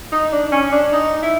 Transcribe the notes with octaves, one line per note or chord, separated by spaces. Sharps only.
D#4
D4
C#4
D4
D#4
E4